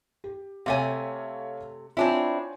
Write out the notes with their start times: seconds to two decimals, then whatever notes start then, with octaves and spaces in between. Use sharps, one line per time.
0.24 G4
0.66 C3 A3 C#5 E5 F5 G#5
1.97 C4 D4 E4 F4 C#5 G#5